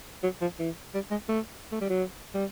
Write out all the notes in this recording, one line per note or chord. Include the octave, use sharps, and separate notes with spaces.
F#3
F3
E3
G3
G#3
A3
A3
G3
F#3
G3